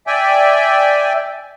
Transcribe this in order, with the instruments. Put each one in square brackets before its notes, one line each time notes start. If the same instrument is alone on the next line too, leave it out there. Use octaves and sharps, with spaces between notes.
[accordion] D5 E5 G5 G#5